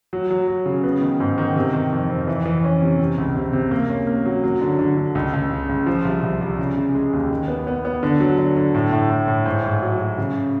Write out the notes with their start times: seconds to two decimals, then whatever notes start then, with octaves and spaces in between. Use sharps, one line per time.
0.13 F#3
0.30 F#3
0.48 F#3
0.66 C#3
0.84 B3
1.01 D#3
1.20 G#2
1.38 D#3
1.56 C3
1.73 D#3
1.92 F2
2.09 F2
2.27 E3
2.46 E3
2.64 C#4
2.81 C3
2.99 C3
3.18 C#2
3.36 C3
3.53 C3
3.71 A#3
3.89 C#4
4.07 A#3
4.25 F#3
4.44 F#3
4.61 D3
4.79 D3
4.97 D3
5.15 C#2
5.34 C#2
5.50 C#3
5.69 C#2
5.86 F3
6.05 C2
6.23 C2
6.41 C2
6.58 C#3
6.77 C#3
6.95 G#3
7.13 D#2
7.31 D#3
7.48 B3
7.67 B3
7.85 B3
8.03 D3
8.20 F#3
8.38 D3
8.57 D3
8.75 A2
8.92 A2
9.10 A2
9.28 A2
9.45 G#2
9.64 G#2
9.82 F#3
10.00 F#3
10.18 C#3